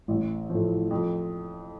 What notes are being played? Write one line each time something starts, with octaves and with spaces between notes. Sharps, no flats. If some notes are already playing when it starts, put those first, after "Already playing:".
A1
A2 F3
F2